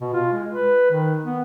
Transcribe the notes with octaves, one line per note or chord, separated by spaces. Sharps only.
B2
F4
G#3
B4
D#3
B3